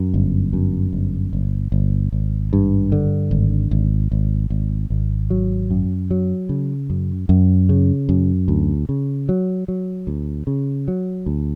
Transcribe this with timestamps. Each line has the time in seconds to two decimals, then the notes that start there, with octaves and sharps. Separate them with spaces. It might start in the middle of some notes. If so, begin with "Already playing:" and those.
Already playing: F#2
0.14 G1
0.53 F#2
0.93 G1
1.33 G1
1.72 G1
2.12 G#1
2.53 G2
2.92 D3
3.31 G#1
3.71 G#1
4.12 G#1
4.50 G#1
4.90 G#1
5.30 F#3
5.71 F#2
6.11 F#3
6.49 C#3
6.90 F#2
7.29 F#2
7.69 C#3
8.09 F#2
8.48 D2
8.89 C#3
9.29 F#3
9.68 F#3
10.07 D2
10.47 C#3
10.88 F#3
11.26 D2